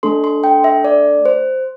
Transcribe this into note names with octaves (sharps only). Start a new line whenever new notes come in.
A3 D4 A4 C6
C6
G5
E5
D5
C5